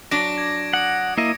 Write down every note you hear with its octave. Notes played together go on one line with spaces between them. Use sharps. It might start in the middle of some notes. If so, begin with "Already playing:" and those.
F#3 D4 D6 A#6 D7
G#6
F#5 D#6 C#7
A#3 E4 D#5